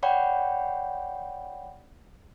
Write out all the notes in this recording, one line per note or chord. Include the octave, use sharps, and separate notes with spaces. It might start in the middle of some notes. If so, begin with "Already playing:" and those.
C#5 D5 F#5 G5 B5